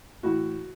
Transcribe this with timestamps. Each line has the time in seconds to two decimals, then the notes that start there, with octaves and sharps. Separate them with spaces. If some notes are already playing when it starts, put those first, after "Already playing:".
0.23 A2 E3 F#4